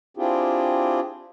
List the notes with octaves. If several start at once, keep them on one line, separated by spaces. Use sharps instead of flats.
C4 D4 E4 F4 G4 G#4